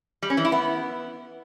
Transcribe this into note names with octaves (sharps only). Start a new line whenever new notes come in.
G3
C#4
E3
E4
B3